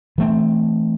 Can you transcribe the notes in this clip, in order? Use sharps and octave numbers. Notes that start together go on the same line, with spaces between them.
E3 A3 C4